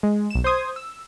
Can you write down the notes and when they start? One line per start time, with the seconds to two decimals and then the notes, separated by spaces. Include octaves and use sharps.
0.03 G#3
0.31 B1 E7
0.44 C5 C6 D#6 G#6
0.76 E6